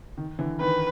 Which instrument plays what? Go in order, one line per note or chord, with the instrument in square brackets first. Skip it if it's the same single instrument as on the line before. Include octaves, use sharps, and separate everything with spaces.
[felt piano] D#3
D3 E3
[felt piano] D#3 [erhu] B4